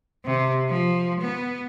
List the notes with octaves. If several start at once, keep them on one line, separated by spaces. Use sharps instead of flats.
C3
F3
B3